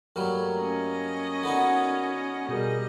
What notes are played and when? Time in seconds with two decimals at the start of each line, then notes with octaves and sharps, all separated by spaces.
0.16 G2 F#3 G3 A3 A#3 A#4 C#5
0.60 C#4 D#5
1.43 D3 B3 D#4 F#4
2.49 B2 G3 G#4 A#4 D#5